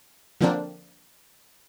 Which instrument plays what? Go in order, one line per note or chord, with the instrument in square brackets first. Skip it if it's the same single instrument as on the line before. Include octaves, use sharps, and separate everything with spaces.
[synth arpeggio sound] D3 F3 A#3 C4 D4